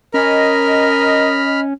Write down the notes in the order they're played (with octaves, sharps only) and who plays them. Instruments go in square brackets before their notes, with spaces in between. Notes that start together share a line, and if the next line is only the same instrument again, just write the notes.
[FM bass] C#4 [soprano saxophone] A#4 [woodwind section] D#5 [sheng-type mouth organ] B5 F6